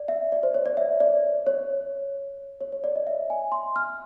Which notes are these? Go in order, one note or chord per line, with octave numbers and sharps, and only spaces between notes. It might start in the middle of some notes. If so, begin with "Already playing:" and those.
Already playing: D5
E5
D5
C5
C#5
D5
E5
D5
C#5
C#5
C#5
D5
D#5
E5
G#5
C6
F6